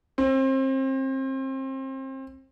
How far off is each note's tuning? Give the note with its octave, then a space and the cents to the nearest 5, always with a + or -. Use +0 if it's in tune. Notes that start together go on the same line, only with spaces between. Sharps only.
C4 +30